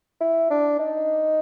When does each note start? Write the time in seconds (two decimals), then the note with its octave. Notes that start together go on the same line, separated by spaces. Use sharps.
0.21 E4
0.50 D4
0.79 D#4